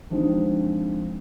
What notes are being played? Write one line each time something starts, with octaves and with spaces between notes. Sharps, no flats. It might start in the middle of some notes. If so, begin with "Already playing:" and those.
D3 F3 G#3 C4 D#4